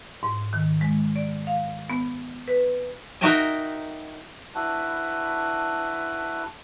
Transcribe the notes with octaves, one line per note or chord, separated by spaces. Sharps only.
G#2
D#3
G#3
D5
F5
B3
B4
D#4 F#4 A#4 E5 G5 G#5
D4 E4 F#4 B4